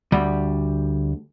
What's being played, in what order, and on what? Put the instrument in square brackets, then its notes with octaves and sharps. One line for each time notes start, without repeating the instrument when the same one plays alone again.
[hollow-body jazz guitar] D2 G3